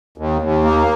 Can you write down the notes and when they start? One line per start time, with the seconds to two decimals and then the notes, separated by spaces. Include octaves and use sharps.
0.18 D#2
0.42 D#2
0.64 A#3